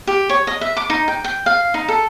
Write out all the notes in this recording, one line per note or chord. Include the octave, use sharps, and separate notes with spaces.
G4
C#5
D#5
E5
D6
D#4
G5
G5
F5
D#4
A4